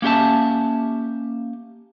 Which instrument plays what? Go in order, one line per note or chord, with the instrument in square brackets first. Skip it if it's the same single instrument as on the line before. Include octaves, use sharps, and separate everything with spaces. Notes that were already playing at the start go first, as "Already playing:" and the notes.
[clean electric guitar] A#3 C#4 G4 E5 A5